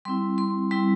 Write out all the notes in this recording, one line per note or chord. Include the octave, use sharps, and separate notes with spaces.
G3 C4 E4 C6
C6
G3 C4 E4 C6